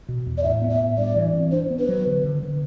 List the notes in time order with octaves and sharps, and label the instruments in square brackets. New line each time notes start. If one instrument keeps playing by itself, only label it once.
[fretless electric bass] B2
E2
[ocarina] D5
[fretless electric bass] A2 [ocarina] E5
[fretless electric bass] B3
[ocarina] E5
[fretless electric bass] A2
[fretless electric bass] G2 [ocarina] D5
[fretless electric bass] E3
C4
[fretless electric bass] D4 [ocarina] C5
[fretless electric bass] B3
[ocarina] B4
[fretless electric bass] F#3
D3
D3
D3